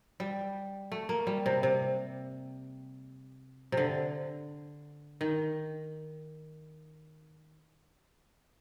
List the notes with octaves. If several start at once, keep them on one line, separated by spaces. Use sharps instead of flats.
G3
A3
A#3
G3
C3
C3
C3
D3
D#3